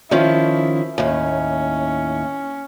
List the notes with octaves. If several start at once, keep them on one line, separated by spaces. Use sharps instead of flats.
D#3 F3 C#4 E4
D#2 A2 C#4